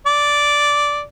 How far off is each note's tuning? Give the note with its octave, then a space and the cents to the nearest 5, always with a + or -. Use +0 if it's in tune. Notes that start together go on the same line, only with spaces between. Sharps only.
D5 -5